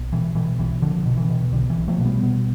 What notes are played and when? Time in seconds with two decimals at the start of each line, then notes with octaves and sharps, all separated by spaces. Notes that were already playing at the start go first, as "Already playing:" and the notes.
Already playing: B1
0.12 B2 E3
0.35 B2 E3
0.59 B1 E3
0.82 B1 D3 F3
1.06 B2
1.17 E3
1.30 B2
1.52 B1 D3
1.70 E3
1.76 B1
1.88 F3 A3
2.00 B2
2.05 G3 B3
2.23 B2